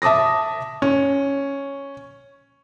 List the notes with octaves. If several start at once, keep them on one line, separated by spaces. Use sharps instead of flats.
E5 A5 D6 D#6 A#6
C#4